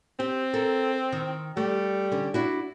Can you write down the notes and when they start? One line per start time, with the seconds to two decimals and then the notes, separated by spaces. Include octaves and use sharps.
0.20 C4 G4
0.54 A4 A#4
1.12 D#3
1.57 G3 A3
2.12 D3 C#4
2.34 D4 E4 F#4